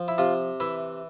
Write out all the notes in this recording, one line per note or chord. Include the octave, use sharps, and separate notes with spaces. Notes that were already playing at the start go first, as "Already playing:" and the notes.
Already playing: F3
E4
C3 F4
E3 E4